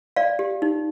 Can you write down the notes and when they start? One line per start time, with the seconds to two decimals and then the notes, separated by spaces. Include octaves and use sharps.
0.16 D5 F5
0.39 G4
0.62 D#4